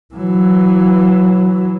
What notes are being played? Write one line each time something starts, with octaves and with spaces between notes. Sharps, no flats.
E3 F#3